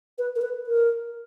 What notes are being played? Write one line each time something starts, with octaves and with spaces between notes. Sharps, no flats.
B4
A#4
B4
A#4